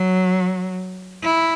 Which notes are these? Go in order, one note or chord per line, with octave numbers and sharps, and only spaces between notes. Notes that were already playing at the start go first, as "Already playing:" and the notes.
Already playing: F#3
E4